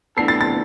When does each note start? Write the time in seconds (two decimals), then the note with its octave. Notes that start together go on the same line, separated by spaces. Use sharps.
0.17 A2 E3 B3 D4 A4 C7
0.28 A6
0.41 A6